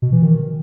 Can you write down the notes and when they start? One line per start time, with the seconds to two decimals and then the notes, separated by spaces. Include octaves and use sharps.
0.02 B2
0.12 E3
0.22 D#3